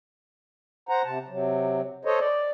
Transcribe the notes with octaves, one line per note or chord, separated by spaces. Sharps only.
C5 F#5 A#5
C3 A5
C3 F#3
A4 C5 C#5 D#5
D5